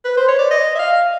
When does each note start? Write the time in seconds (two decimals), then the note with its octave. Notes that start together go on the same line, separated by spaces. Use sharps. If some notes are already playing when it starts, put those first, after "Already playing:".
0.05 B4
0.17 C5
0.28 C#5
0.39 D5
0.51 D#5
0.75 E5
0.79 F5